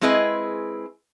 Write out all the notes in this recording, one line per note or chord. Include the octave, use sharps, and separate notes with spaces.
G#3 C4 E4 G#4 B4 D#5